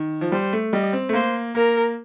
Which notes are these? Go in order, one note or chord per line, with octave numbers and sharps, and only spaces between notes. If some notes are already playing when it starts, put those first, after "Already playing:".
Already playing: D#3
F3
G3 C5
A3
G3 D#5
C4
A3
A#3 C5
A#3 A#4